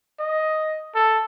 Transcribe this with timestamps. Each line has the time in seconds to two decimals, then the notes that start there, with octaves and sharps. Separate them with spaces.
0.19 D#5
0.95 A4